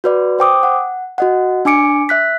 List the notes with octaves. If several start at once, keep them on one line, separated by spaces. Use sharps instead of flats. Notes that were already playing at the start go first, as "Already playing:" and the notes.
F#4 B4 D5
C5 G5 D6 D#6
F#5
F#4 D#5 F#5
D4 G#5 D6 C#7 D7
E5 F#6 B6